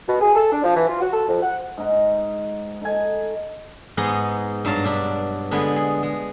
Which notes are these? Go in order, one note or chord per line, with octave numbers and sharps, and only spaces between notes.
B2
G#4
A4
D4
F3
E3
F4
F#4
A4
F2
F#5
G#2 D#4 F#5
D#4 A4 G#5
G#2 B3 D#4 G#4 D#5 F#5
G2 F#3 F5 A5 A#5
B2 D4 B5
D3 G#3 B3 B4 G#5
G#4
G#3